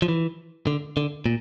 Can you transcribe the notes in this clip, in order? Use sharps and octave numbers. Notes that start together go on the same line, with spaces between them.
F3
E3
D3
D3
A#2